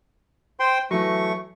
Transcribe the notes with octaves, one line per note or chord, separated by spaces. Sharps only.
C5 G5 C6
E3 F#3 A3 C#6